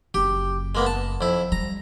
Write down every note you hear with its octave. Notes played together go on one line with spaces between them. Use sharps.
F#1 G4
G#3 A#3 B3
A5
F2 E4
G3 A#5